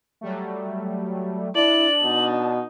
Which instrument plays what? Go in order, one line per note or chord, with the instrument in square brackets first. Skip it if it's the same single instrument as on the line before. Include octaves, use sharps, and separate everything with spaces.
[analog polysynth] F#3 G3 A3
[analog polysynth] D4 A5 [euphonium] E4 [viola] D5 [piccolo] F#7
[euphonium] B2 [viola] D#4